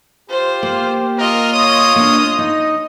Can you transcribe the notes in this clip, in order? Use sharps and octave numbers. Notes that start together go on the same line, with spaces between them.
F4 G4 C5
A#3
F4 A#4 D#5
C#5 D#6
A#3 D4
D#4 D#5